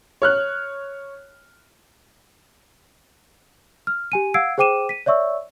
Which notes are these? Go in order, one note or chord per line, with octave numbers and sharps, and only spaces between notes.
C#5 F6 F#6
F6
G4 G#5 D#7
F5 F#5 E6 G#6 C7 D7
G#4 C5 G5 D6 D#7 E7
B6 D#7
C#5 D5 E5 C#6 E6